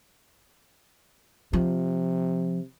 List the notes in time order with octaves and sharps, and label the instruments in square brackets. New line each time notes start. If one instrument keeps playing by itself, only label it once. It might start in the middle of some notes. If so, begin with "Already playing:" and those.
[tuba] C3 [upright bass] F3